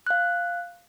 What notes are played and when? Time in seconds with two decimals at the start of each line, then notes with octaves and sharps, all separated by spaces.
0.07 F5 F#6